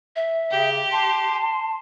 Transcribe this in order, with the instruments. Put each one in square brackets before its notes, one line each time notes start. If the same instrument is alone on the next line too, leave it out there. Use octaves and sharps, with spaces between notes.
[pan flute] E5
[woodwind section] C#3 G5 [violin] G4
[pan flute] A5 [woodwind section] C6